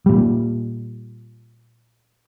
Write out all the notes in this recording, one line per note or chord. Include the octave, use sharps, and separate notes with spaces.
A#2 G3